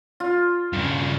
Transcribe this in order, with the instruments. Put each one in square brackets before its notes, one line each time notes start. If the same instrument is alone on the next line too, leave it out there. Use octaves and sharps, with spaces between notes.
[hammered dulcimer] F4
[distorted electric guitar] G2 C#3